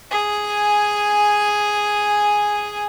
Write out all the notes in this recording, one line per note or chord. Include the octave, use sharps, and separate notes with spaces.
G#4 G#5